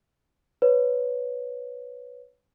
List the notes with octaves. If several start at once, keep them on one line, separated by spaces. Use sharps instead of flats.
B4 C#5